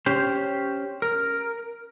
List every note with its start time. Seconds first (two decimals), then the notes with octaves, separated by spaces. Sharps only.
0.06 C#4 G4 C5
1.02 A#4